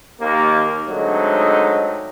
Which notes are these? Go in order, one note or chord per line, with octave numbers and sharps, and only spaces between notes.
D#2 A#3
D3 F#3 G#3 A3 C4 D#4